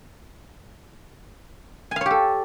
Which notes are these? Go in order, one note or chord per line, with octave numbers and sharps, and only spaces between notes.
G4 A4 C#5 F5 G#5